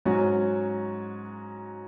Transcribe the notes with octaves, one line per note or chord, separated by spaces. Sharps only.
G#2 F#3 C#4 F#4